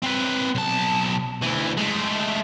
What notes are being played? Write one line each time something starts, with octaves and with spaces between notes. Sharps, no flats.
C4 B4
B1 A5
D2 E3
G#3 A3